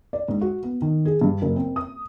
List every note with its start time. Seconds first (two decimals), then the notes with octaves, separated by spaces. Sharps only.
0.13 D5
0.28 G#2
0.41 F#4
0.63 B3
0.82 D#3
1.05 G#4
1.21 G2
1.42 F#1
1.56 C4
1.76 D#6